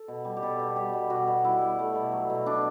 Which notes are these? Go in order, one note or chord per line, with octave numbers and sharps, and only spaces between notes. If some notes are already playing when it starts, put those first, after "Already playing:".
Already playing: A4
B2
G3
G4
B2 A4
B2
G3 G4
B2
B2 F#4
B2
G3 E4
G3
A3
B2
F#3
B2
B2 D4